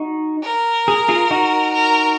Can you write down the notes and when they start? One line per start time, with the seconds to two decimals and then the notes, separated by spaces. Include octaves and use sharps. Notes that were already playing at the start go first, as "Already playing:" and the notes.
Already playing: D#4 F#4
0.43 A#4
0.88 G#4
1.08 F4 G#4
1.31 D#4 F#4
1.74 A#4